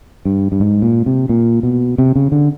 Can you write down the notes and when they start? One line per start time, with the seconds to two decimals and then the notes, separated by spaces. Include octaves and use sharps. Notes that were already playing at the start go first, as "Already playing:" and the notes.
0.25 G2
0.52 G2
0.60 G#2
0.82 A#2
1.06 C3
1.29 A#2
1.63 B2
1.98 C3
2.16 C#3
2.32 D3